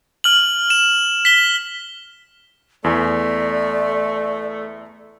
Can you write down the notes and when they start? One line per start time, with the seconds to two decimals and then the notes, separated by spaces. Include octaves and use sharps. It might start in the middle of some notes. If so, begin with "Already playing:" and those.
0.24 F6 F#7
0.70 E7
1.25 B6 G7
2.84 E2 A3 D5 G#5